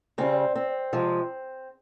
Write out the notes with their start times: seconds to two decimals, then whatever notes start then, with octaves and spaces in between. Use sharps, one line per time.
0.18 C#3 G3 C4
0.56 C4
0.93 C3 F3 G#3